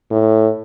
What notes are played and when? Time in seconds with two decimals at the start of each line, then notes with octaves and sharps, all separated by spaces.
0.11 A2